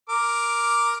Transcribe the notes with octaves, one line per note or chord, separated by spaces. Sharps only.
A#4 D6